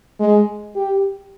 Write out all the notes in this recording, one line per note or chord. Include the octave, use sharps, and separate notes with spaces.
G#3
G4